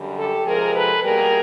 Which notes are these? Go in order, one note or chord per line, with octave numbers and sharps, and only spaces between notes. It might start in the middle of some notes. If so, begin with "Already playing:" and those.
Already playing: F#2 D3 G3
G4 A4
C3 F3 G#3 G#4 A#4
A4 B4
B2 G3 A#3 G#4 A#4